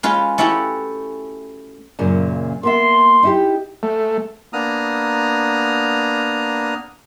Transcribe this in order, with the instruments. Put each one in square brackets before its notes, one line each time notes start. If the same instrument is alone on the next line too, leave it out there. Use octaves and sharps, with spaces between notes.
[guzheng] G#3 C#4 F4 B4
A3 C#4 E4 F#4 G4
[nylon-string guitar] F#2 A#2 C#3
[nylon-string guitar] A#3 B3 E5 [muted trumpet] C6
[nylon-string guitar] D#4 E4 G4
[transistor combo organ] A3
[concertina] A#3 B3 D4 A#5 D#6 F6